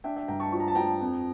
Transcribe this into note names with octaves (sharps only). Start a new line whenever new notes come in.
D4 E5 G5
E5 G5
G2 G5 A#5
A5 C#6
F3 C#6
A#5
A5
F3 G5 A#5
F2